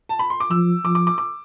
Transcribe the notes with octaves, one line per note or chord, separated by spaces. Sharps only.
A5
B5
C6
D6
F3 E6
F3 D6
D6
D6
D6